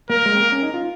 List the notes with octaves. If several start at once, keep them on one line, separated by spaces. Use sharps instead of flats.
A#3 A#4
G#3
C4
A#3
C#4
D#4
F4